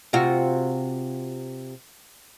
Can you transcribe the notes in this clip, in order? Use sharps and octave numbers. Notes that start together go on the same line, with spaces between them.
C3 F4 F#4